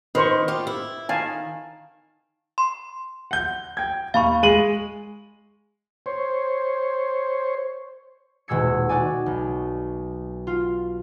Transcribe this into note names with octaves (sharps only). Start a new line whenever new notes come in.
D#3 B4 C5 C#6
F4 G4
E4
D#3 F5 G#5 A5
C6
F#5 G6
G5 G#6
D#2 F5 B5 C#6
G#3 D#7 F#7
C5 C#5
D#1 B2 G#3 E6 G#6 C#7
D#4 F#4 D5 G#5
B1
F4